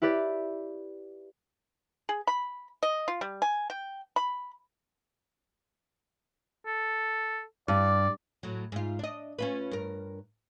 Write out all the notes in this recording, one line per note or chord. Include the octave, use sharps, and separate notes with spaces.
E4 G4 B4 D5
G#4
B5
D#5
F4
G3
G#5
G5
B5
A4
G2 D5
A2 F#3
G#2 F4
D4 D#5
C#4 F4 B4
G2 A#4